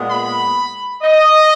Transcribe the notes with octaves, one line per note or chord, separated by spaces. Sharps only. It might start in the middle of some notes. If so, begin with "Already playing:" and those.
Already playing: A#2 G#3 B3
B5
D#5